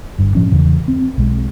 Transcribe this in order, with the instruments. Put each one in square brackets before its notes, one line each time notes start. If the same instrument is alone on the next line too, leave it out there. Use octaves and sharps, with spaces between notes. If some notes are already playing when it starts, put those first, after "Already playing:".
[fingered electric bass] G1 G2
A2 F3 C#4
E2 C#3 E3
C4
B1 G#3